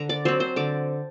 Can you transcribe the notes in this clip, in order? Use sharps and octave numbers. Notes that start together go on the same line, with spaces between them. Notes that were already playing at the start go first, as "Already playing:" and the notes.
Already playing: D3 A#5
D5
F#3 C4 C5
C5
D3 D5